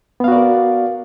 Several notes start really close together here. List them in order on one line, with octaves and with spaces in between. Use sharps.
B3 F5 F#4 D5 A#4